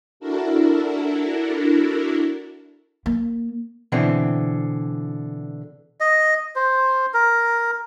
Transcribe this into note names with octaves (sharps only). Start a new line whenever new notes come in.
D4 E4 F#4 A4 A#4
A#3
B2 D3 E3 C4
D#5
C5
A#4